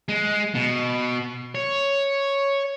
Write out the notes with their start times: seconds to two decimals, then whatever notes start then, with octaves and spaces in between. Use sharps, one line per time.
0.09 G#3
0.55 B2
1.55 C#5